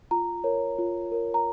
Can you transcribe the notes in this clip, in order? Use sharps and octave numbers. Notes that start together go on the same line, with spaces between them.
F4 A#5
A#4 C#5
F4
A#4 C#5
A#5